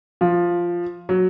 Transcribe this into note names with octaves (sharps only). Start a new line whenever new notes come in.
F3
F#3